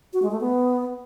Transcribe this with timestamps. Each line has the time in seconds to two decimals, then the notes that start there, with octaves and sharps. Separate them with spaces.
0.13 F#4
0.22 G#3
0.31 A3
0.40 B3